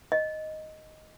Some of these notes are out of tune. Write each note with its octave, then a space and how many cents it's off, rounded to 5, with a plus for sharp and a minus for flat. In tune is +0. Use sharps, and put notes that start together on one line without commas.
D#5 +0